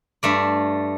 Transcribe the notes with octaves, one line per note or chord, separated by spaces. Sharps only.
G2 A3 D5